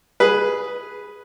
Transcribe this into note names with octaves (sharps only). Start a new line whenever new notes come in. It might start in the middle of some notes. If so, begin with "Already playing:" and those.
G#4 B4